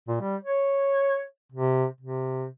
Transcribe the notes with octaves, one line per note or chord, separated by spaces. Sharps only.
A#2
G3
C#5
C3
C3